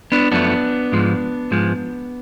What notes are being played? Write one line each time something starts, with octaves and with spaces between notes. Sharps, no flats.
B3 D4
F#2 F3 A3 B3 D4
G#2 F3 G#3
G#2 F3 G#3